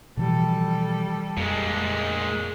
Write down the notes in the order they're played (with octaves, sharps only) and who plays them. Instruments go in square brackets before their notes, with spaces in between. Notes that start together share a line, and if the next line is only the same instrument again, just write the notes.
[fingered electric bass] B2 E3 F3 [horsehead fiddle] G3 A4
[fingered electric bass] F2 [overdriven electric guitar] A#2 G#3